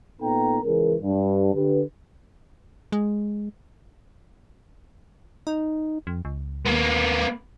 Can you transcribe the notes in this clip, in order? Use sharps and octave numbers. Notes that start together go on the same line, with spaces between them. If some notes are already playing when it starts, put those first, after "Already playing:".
A#2 B3 D#4 A4 G5 A#5
C#2 E3 C#4 G#4 A#4
G2
D3 G4 B4
G#3
D#4
F2
C#2
D#2 A#3 B3